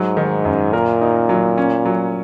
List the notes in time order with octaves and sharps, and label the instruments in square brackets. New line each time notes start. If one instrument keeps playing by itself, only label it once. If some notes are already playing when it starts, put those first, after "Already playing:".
Already playing: [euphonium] G#2 [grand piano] F#3
[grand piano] D#3
F#2
[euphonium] A#2 [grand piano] A#4
[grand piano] D#4
F#3
C#4
F#3